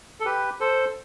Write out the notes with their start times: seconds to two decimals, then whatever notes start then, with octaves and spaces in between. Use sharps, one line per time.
0.20 A4
0.25 G4 B4
0.60 A4 C5